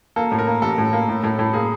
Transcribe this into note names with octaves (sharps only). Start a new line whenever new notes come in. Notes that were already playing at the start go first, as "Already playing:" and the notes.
A#3 A4
A2
A#4
A#3
A1 A4
A2
A#3
A2
A2
A2
A#3 G#4